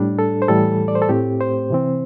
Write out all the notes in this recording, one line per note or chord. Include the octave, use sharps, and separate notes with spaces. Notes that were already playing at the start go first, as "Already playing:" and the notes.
Already playing: A2 G3 D4
A4
C5
A2 E3 G3 A4
D5
C5
A4
A2 A3 C4 G4
C5
C3 E3 C4